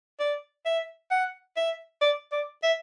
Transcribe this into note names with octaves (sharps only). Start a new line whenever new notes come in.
D5
E5
F#5
E5
D5
D5
E5